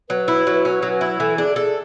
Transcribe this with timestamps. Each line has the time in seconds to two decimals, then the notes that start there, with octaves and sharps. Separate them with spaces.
0.09 F#3 B4
0.28 E4
0.47 F#3
0.65 C#4
0.82 F#3
1.01 E4
1.20 E3 A4
1.37 D4 G#4
1.56 G#4 A4